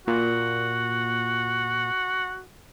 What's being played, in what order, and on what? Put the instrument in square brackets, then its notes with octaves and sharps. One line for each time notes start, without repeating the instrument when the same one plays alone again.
[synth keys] A#2 [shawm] F#4